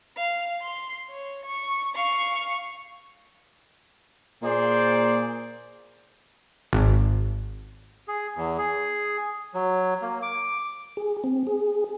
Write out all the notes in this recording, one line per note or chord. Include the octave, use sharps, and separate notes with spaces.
F5
C6
C#5
C#6
F5 C#6
A#2 A#3 G#4 C5 D5
G#1
G#4
E2
G#4
F#3
A#3
D6
G#4
C4
G#4